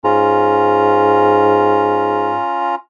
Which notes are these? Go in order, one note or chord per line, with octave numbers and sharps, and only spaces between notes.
G#2 C#4 F4 A#5